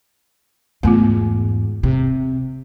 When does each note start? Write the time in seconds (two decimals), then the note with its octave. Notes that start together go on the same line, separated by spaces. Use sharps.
0.83 E2 G#2 A3 B3 F4
1.83 C3